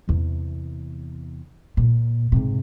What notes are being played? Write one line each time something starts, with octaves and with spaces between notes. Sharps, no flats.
E2 C3
A#2
G#2 C3